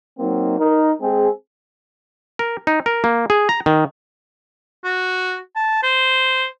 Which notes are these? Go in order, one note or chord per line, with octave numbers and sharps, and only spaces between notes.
F#3 A#3 C4 D#4
D#4 A#4
G#3 C4 G#4
A#4
D#4
A#4
A#3
G#4
A#5
D#3
F#4
A5
C5